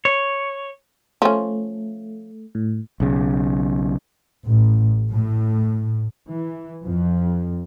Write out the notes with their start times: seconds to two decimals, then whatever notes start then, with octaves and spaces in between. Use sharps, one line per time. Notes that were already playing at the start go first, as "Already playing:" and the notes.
0.05 C#5
1.22 F3 A3 C#4
2.55 A2
3.00 B1 C#3
4.46 A1
5.11 A2
6.29 E3
6.86 F2